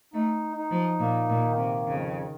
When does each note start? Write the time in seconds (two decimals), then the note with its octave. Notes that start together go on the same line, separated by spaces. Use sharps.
0.14 A3 D#4
0.57 D#4
0.71 F3
0.99 A#2 A#3
1.29 A#2
1.43 D#3
1.57 C3
1.86 F2 C#3